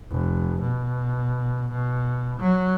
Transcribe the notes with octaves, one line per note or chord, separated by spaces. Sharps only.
F1
B2
B2
F#3